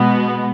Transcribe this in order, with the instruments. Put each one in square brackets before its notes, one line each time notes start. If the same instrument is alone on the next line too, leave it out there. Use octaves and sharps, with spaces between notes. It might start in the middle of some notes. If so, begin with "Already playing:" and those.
Already playing: [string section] B2 G#3 B3